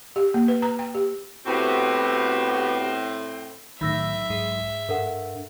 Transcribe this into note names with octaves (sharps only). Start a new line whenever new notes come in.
G4
A#3
B4
A#5
G5
G4
A2 B3 C4 F#4 G4
B1 A2 D#3 E5 B5 E6 A#6
G#2 G#3
G2 A4 A#4 F#5